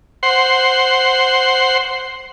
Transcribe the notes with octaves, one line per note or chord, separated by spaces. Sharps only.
C5 F#5 C6